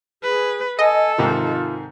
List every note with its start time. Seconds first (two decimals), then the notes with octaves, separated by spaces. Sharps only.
0.23 G#4 B4
0.79 A4 D#5 G#5
1.18 G#2 C3 D#3 F4